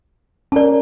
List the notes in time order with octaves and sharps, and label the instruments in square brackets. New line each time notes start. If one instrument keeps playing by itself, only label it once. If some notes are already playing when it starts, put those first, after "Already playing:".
[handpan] C#4 A#4 [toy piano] D5 A5